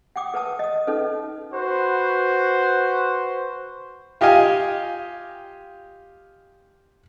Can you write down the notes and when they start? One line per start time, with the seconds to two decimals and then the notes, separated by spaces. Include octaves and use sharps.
0.16 F#5 G5 D6 D#6
0.34 A#4 B4 F#5 A5 D#6
0.59 D#5 D#6
0.87 C#4 D#4 A4 B4
1.54 F#4 B4 C5
4.21 F4 G4 D#5 F5 G#5